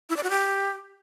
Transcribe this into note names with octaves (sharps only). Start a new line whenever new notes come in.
E4
D5
F#4
G4